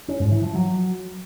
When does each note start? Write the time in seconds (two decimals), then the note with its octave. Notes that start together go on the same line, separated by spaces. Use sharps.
0.08 C#4
0.20 G#2
0.31 E3
0.43 F3
0.55 F#3